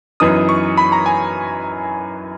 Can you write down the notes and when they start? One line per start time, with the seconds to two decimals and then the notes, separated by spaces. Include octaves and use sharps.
0.20 F#2 E3 B3 D#4 D#6
0.49 C#6
0.77 B5
0.92 A#5
1.06 G#5